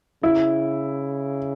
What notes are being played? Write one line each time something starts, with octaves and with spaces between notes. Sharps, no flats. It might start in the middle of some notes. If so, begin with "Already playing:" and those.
C#3 E4